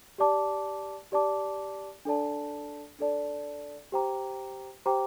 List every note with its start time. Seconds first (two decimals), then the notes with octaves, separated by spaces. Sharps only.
0.18 G4 D5 A5 D6
1.12 G4 D5 A5 D6
2.05 D4 A4 D5 A5
2.99 D4 A4 D5 A5
3.92 G4 C5 G5 A#5 D6
4.86 G4 C5 G5 A#5 D6